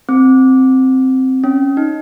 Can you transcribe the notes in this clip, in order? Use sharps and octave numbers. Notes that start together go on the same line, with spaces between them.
C4
C#4
D#4